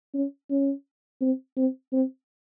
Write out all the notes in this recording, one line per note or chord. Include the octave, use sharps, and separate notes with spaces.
C#4
C#4
C4
C4
C4